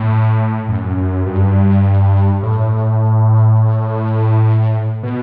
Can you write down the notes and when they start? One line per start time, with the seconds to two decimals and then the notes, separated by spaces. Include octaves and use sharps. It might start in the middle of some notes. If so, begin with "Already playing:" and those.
Already playing: A2
0.69 F#2
0.97 F#2
1.26 G2
2.43 A2
5.03 B2